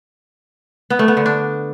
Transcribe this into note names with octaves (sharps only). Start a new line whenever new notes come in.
B3
A3
B3
D3
D4